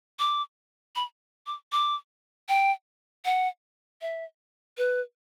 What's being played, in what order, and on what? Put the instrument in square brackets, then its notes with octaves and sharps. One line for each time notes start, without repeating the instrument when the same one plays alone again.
[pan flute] D6
B5
D6
D6
G5
F#5
E5
B4